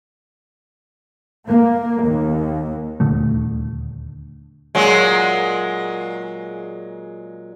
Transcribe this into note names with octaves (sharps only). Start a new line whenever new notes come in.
A#3
D#2
D#1 D2 D3 A3
A#2 F#3 G#3